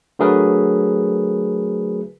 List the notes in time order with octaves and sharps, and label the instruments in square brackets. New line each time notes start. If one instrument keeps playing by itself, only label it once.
[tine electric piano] D3 F#3 A3 G#4 A#4 B4